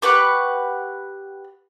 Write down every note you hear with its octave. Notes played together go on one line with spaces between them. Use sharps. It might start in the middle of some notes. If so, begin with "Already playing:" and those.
G4 B4 F#5 C#6